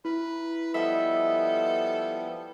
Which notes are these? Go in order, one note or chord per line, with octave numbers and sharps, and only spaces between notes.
E4 B4
F3 G3 B3 A4 D#5 E5